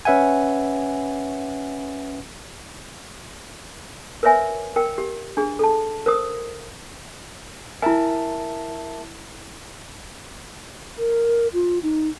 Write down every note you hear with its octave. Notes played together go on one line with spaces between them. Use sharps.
C#4 B4 E5 F#5 G#5
A#4 B4 C#5 E5 G#5
A#4 G5
G4
D4 G#4
A4 A5
A#4 C5 D#6
E4 A#4 E5 G#5 A5
A#4
F4
D#4